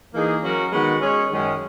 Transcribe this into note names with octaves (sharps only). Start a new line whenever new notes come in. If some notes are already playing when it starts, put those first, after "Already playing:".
E3 A#3 D#4 G#4
F#3 C#4 F#4 A#4
D#3 G#3 B3 F#4
G#3 C#4 G#4 C#5
F#2 D#3 G#3 C#4